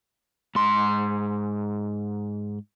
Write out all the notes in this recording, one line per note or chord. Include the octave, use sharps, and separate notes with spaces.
G#2 C6